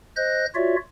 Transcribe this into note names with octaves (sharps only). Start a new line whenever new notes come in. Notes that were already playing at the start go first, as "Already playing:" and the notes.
C5 D#5 F#6 G6 A#6
F4 F#4 C#5 D5 E5